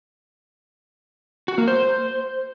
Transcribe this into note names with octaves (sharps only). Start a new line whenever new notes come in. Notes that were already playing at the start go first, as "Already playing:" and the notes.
F#4
A#3
C5